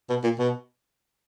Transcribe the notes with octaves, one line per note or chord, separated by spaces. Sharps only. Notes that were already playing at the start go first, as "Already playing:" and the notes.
B2
A#2
B2